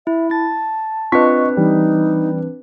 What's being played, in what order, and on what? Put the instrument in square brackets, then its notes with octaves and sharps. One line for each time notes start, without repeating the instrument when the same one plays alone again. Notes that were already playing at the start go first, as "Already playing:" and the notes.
[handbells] E4 [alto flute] E5
[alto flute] A5 [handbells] A6
[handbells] C4 D4 B4 [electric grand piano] F4 B6 [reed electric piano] D#5 C#6
[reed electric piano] E3 [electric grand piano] G3 [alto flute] D#4